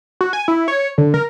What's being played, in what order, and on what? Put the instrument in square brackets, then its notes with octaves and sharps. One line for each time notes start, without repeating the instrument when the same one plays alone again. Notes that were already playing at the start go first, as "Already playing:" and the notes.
[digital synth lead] F#4
G#5
E4
C#5
D3
A#4